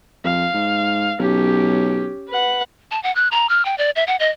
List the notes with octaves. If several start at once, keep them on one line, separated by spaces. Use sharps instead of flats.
F2 F5
G#2
B1 C#4 G4
B4 F#5
A5
F#5
F#6
A#5
F6
G5
D5
E5
F#5
D#5